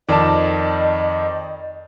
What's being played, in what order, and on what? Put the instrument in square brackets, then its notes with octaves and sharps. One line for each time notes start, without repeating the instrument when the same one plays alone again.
[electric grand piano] F2 D#3 [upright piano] D5 A5 [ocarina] D#5